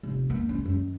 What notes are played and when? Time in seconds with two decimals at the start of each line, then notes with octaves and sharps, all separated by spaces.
0.03 F1
0.30 E2 A#3
0.49 C#2 E4
0.66 F#2 D#3